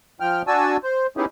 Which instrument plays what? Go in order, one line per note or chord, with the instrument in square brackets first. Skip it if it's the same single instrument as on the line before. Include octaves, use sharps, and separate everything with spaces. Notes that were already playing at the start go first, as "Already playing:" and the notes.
[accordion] F3 G5 F6
D4 F#4 G#5 A5 E6
C5
B3 C#4 D#4 E4 G4 G#4